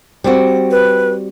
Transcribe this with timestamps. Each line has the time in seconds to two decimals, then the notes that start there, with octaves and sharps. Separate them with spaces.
0.24 G3 C4 F#4
0.71 B4